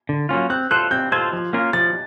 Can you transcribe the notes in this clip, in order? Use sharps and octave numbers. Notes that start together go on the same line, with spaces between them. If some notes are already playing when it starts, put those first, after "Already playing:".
D3
F#3 A#3 C#4 F4
C4 F#6
F4 A4 C5 F#6
C4 G6
F4 A4 C5 G#6
F3
A#3 C#4 F4 A#4
F3 A6